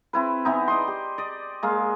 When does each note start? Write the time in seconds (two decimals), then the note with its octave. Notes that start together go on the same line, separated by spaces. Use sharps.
0.13 C4 E4 B4
0.45 E3 B3 D#4
0.68 D5 D#5 C6
0.88 G4
1.18 D5 D#5
1.63 G#3 A#3 F5